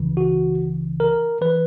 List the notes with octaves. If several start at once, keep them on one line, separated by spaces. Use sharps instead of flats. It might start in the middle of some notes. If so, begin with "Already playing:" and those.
Already playing: C#2 C#3 E3
F#4
A#4
E3 B4